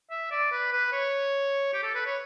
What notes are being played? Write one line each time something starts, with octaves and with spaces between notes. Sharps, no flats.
E5
D5
B4
B4
C#5
G4
A4
B4
C#5